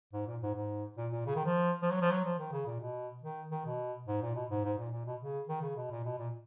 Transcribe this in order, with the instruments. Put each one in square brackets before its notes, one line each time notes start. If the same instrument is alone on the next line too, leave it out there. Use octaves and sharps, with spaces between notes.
[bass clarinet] G#2
A#2
G#2
G#2
A#2
A#2
C#3
D#3
F3
F3
F#3
F3
F#3
F3
D#3
C#3
A#2
B2
D#3
D#3
B2
G#2
A#2
B2
G#2
G#2
A#2
A#2
B2
C#3
D#3
C#3
B2
A#2
B2
A#2